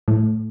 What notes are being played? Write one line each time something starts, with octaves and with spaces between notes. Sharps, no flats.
A2